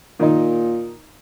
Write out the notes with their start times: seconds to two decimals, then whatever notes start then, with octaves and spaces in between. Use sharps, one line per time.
0.19 A#2 D#3 D#4